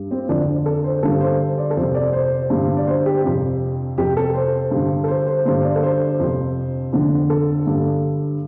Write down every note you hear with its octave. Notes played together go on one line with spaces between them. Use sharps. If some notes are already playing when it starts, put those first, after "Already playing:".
Already playing: G2
C4
F2 D3 D4
A4
C5
G2 D3 A4
C5
D5
A4
F2 C3 C5
D5
C5
G2 D3
D5
C5
G4
F2 C3
F2 C3 G4
A4
C5
G2 D3
A4
C5
C5
G2 D3 C5
D5
A4
C5
F2 C3
F2 D3
A4
G2 D3